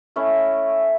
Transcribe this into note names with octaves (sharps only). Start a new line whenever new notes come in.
A3 C#4 E4